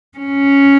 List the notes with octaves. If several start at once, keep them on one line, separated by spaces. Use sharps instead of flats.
C#4